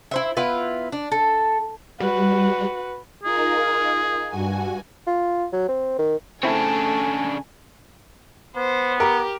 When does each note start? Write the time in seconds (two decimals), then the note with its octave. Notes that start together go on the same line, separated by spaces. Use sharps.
0.11 E4 C5 E5
0.37 B3 E4 F4 B4
0.92 D4
1.12 A4
2.00 G3 F#4 B4
3.24 D#4 F4 G#4 A#4
4.29 G2 F#4 G#5
5.07 F4
5.53 F#3
5.68 C4
5.99 D#3
6.43 C#3 A3 C4 D4 E4 G#5 A5
8.56 B3 C5
9.00 G4 A#4